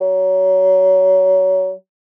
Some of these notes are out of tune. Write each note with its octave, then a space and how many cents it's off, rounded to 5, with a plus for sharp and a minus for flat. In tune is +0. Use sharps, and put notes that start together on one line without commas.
F#3 +25